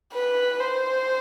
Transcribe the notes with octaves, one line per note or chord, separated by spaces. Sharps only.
B4
C5